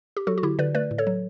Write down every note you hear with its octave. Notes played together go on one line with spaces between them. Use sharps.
G4
F#3 F#4 A4
F#4
D3 E4 G4
D3 B4 D5
A3 B4 D5
A2
A4 C#5
F#3